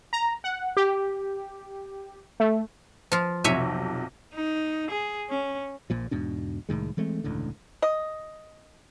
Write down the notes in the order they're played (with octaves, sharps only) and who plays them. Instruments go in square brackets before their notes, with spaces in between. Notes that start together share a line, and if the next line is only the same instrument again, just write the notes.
[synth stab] A#5
F#5
G4
A3
[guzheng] F3 F4
[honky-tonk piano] B1 F2 C3 [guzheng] C#5 E5 G#5
[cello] D#4
G#4
C#4
[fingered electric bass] A#1 A#2 F3
E2 G#2 B2 D4
C2 A2 D#3 G#3
E3 G#3 A3 C4
E1 C#2 A2 D3
[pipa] D#5